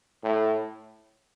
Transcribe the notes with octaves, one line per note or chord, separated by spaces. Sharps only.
A2